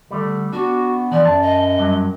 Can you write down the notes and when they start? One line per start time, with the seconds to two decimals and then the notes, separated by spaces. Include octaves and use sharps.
0.11 D3 G3 A3
0.53 B3 D4 F#4
1.11 E3 F3 D5
1.25 F#2 A5
1.41 D#5
1.78 G2 F#3